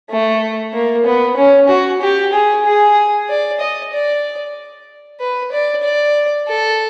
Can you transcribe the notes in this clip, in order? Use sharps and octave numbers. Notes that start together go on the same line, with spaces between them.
A3
A#3
B3
C#4
F#4
G4
G#4
G#4
D5
D#5
D5
B4
D5
D5
A4